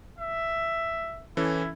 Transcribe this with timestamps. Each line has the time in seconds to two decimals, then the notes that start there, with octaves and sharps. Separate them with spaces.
0.19 E5
1.37 E3 C#4 E4 A4